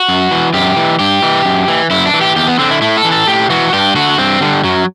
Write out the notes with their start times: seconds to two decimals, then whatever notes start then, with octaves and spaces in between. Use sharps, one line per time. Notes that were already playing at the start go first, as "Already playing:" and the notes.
Already playing: F#4
0.09 F#2
0.31 E3
0.54 F#2 G4
0.77 E3
0.99 G2 G4
1.23 E3
1.45 F#2
1.68 E3
1.90 F#2 E4
2.05 D4
2.14 E3
2.21 G4
2.36 E2 G4
2.47 B3
2.59 D3 C4
2.70 E4
2.81 A2 E4
2.97 A4
3.05 E3
3.11 A4
3.27 A2 G4
3.50 E3 F#4
3.73 G2 G4
3.96 D3 F#4
4.18 G2 C4
4.41 D3 G3
4.64 F#2 F#3